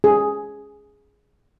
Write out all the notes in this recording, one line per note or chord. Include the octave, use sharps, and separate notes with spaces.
G#4